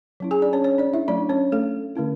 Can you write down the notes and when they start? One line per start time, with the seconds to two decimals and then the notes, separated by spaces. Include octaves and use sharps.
0.20 F#3 C#4 E4
0.31 G#4 G#5
0.42 D4 D5
0.53 C#4 C#5
0.64 C#4 C#5
0.78 D4 D5
0.94 E4 E5
1.08 F#3 A3 C#4 D4 E4 D5
1.29 C#4 C#5
1.52 A3 A4
1.95 D3 A3 C#4 E4